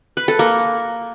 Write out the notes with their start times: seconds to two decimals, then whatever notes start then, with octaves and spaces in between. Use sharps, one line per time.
0.17 B4
0.28 A4
0.39 A#3